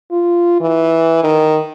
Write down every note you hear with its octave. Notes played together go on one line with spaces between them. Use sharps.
F4
E3
D#3